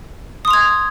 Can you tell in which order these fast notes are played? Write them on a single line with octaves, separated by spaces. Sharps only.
D#6 C6 F7 G#6